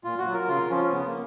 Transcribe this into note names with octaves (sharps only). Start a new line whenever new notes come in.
A#2 F4
F#4
F#3
A#4
C#3 F4
F3 C#4
C#3 B3
A#3